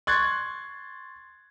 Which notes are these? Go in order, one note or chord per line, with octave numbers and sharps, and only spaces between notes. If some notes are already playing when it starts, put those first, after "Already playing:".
C6 C#6 F#6 G#6 A6